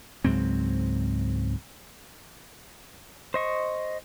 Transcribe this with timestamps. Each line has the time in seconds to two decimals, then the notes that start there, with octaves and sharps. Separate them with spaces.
0.25 C#2 G#2 F#3 C4
3.34 C5 D#5 C#6